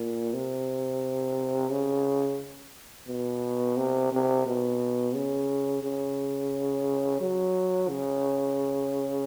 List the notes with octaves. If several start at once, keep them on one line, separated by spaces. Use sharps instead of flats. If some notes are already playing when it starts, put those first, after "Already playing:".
Already playing: A#2
C3
C#3
B2
C3
C3
B2
C#3
C#3
F#3
C#3